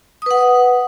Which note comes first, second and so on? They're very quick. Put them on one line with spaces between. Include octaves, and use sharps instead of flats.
D#6 B4 F#5